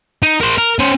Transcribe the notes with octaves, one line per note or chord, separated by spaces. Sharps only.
D#4
A#4 C5
A#4
C#4 C5